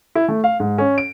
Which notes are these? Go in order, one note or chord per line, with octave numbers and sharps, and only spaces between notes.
E4
A3
F5
G#2
C#4
D7